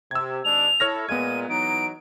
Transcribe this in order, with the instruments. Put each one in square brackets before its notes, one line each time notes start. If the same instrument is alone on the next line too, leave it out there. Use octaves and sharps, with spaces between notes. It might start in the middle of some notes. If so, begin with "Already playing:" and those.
[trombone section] C3 [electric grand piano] E6 G#6
[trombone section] G#1 G#3 D4 [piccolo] F7
[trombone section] E4 A4 [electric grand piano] C#5 F6 A#6
[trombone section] A#2 G#3 [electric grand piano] B3 G#6 [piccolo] D#7
[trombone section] E3 F#3 D#4 [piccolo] D7